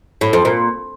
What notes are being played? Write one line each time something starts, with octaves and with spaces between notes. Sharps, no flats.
A2
F2
A#2